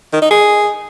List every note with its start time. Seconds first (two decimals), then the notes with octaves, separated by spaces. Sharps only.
0.13 D#3
0.22 D#4
0.31 G#4